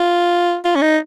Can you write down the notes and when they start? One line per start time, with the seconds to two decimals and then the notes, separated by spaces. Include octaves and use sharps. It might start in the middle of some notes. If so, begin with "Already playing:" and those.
Already playing: F4
0.64 F4
0.75 C#4
0.82 D#4